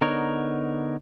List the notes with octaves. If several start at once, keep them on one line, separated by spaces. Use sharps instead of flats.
D3 B3 D#4 A#4 C#5